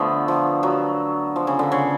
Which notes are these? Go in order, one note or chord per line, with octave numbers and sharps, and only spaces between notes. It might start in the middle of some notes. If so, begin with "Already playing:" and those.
Already playing: D3 F3 A3 B3
F3
F#3
F3
C#3
D3
C#3